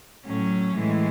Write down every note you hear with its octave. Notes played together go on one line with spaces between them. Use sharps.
A2 F#3 C#4
A2 E3 G#3